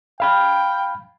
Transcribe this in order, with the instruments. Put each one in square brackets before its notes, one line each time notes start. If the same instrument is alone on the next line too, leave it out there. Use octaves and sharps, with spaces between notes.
[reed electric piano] F5 B5 F6 [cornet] G5